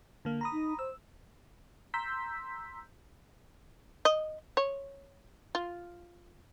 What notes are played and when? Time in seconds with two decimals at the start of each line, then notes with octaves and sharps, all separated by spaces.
0.25 D3 A#3
0.41 A#5 B5 D#6
0.53 D#4
0.79 C5 E6
1.94 A#5 C6 E6 G6 B6
4.05 D#5
4.57 C#5
5.55 F4